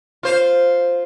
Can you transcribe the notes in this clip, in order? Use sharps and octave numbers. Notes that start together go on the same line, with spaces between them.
F4 C5